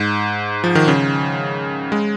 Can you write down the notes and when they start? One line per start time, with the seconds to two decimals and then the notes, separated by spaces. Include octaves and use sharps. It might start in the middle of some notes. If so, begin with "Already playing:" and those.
Already playing: G#2
0.64 F3
0.75 D#3
0.88 C#3
1.92 G#3